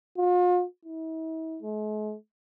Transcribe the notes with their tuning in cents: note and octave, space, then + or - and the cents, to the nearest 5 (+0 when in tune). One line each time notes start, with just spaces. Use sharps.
F4 +40
E4 -45
G#3 +45